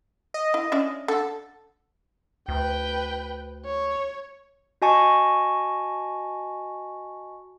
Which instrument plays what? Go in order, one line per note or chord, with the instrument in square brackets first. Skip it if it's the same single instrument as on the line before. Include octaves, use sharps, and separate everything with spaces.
[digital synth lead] D#5
[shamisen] E4
C#4 D4 E5
[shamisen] D3 [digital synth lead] A4
[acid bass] D2 [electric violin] B4 G5
[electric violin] C#5
[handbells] F#4 D#5 G#5 A5 C#6